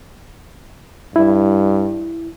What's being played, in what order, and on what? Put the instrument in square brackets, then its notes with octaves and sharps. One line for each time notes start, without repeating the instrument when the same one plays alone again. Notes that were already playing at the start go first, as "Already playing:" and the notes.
[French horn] G2 [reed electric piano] E4